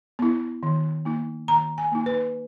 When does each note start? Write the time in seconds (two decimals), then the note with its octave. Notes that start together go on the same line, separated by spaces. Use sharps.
0.19 B3 E4
0.63 D#3
1.05 A#3 D#4
1.48 D#3 A#5
1.78 G#5
1.92 A#3 D#4
2.06 B4